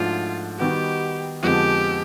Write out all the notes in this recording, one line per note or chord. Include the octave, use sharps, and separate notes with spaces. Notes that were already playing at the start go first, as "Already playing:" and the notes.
Already playing: G#2 F3 A3 D4 F4 F#4
D#3 G3 B3 D#4 F#4 G4
F2 D3 F3 G#3 B3 G4